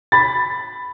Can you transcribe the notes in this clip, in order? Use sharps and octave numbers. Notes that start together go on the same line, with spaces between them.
B5 A6